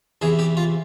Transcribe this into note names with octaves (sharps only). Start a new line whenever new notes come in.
E2 C3 E3 G#4
G4
F4